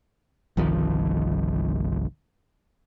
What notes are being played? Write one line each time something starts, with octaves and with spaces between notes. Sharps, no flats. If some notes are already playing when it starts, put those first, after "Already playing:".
G1 C2 D#3 F3